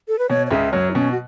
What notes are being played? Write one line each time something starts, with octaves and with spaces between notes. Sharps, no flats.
A4
B4
B2 C#5
C#5
C#2 C#3 E5
F#2 F#3 C#5
E4
B2 C#4
F#4